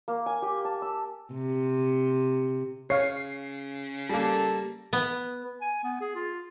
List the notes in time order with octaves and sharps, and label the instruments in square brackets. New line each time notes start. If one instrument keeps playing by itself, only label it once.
[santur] A#3
G#5
G4
A5
E6
[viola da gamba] C3
[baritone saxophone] C#3 [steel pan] C#5 F5 [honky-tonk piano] C7
[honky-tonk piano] G3 A#3 [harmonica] A4
[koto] B3
[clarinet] G#5
B3
G#4
F4